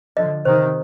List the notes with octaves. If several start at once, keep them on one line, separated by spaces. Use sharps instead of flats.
D3 F3 D#5
C3 D#3 C5